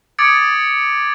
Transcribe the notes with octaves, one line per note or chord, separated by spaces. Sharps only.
D6 D#6 G#6 A6 C#7 D7